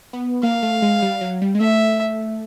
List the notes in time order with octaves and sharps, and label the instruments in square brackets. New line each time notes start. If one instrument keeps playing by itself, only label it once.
[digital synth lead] B3
[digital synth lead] A#3 [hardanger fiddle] F5
[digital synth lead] A3
G#3
G3
F#3
G3
G#3
[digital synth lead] A3 [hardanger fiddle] E5